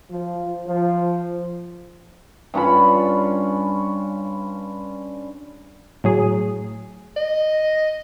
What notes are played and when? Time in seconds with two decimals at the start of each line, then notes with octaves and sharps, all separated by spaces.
0.11 F3
0.67 F3
2.54 G2 C#4 F4 B5
6.04 A2 F#3 G#4
7.17 D#5